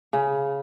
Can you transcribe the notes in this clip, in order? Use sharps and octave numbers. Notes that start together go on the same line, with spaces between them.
C#3